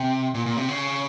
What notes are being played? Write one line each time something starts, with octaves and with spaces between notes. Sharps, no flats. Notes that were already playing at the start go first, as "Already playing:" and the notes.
Already playing: C3
A#2
A#2
C3
C#3